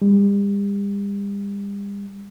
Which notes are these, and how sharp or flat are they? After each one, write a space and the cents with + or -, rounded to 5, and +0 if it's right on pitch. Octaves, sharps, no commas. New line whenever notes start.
G3 +40